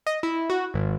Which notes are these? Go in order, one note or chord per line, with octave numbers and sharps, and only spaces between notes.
D#5
E4
F#4
G#1